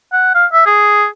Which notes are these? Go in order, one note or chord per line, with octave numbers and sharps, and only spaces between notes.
F#5
F5
E5
G#4